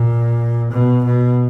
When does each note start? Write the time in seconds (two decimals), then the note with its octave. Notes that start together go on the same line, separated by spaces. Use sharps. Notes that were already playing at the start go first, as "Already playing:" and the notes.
Already playing: A#2
0.72 B2
1.05 B2